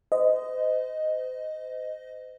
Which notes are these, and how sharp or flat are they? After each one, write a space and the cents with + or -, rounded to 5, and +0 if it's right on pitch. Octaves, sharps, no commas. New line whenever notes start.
C5 -35 D#5 +0